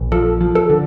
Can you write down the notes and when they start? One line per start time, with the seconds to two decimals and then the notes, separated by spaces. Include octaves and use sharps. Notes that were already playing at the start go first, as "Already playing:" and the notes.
Already playing: A#1
0.12 F3 A4
0.41 F3
0.55 A4
0.70 D3